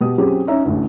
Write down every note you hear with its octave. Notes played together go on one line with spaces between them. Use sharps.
B2 B3 G4 D#6
F#3 C4 C#4 F4 G4 G#4
C#4 D#4 E5 A#5
A1 D2